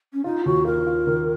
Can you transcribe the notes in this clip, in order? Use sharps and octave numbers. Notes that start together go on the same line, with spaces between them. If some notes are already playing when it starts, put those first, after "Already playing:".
C#4
D#4 F4
D#2 F#4
F4 A#4
F4
D#3